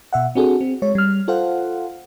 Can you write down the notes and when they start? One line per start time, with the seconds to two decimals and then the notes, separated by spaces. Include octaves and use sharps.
0.13 B2 E5 F#5
0.35 C4 D4 F#4 G#4 A4
0.61 C4
0.82 G#3 C#5
0.95 G3 F6
1.28 F4 A4 C5 F5 F#5